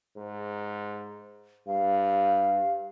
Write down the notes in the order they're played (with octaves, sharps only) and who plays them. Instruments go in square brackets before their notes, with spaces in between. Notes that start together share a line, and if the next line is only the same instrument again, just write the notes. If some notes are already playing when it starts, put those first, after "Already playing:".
[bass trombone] G#2
[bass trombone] G2 [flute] F5